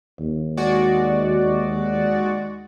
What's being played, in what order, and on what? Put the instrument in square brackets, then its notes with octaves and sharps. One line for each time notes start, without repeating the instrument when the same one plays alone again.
[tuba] D#2
[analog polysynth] G#3 F#4 D5